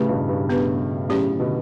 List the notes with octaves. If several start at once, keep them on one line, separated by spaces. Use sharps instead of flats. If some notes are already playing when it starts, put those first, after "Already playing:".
Already playing: A2 C#3 A3 C#4 G4 B4
G2 B2
G2
B3 D4 G4 B4
A2 C#3 F#3 C#4 G4 D5
C#3
B2 D3